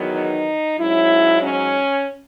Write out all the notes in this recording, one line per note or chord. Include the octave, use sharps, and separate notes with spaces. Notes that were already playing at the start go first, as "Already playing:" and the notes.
Already playing: E2 D#3 F#3 B3
D#4
G#2 F#3 C#4 E4
C#4